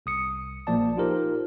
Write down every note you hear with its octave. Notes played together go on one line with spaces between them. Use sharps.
C2 D#6 C#7
A#1 F3 A#3 D5 A5
D#4 F4 G4 A#4 C5